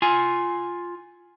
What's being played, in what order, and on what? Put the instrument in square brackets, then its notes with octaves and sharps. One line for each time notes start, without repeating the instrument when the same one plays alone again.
[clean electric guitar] F4 G#5